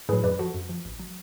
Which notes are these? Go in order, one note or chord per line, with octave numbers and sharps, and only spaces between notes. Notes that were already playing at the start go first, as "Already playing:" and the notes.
A2 F#3 G#4 B4
F#2 B4 D5
F3 F#4 A4
F#2
F3
A1
F#3